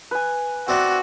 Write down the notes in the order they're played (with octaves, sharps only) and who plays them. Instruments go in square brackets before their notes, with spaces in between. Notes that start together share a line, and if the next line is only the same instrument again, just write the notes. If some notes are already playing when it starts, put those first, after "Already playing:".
[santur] B4 G#5
[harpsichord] C4 D4 [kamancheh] F#4 [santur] E5